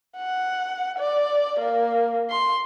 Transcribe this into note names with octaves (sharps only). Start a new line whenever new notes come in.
F#5
D5
A#3
C6